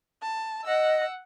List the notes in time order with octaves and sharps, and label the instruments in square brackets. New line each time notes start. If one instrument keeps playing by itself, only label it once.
[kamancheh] A5
[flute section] D#5 [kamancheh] F#5 E6